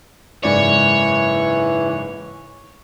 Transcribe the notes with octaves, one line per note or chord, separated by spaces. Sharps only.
F#1 G#2 E3 C#5 D5